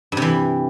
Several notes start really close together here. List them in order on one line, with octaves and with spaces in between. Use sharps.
G2 C3 E3